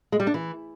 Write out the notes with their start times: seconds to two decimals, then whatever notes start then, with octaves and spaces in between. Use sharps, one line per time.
0.12 G#3
0.20 G3
0.27 D4
0.34 E3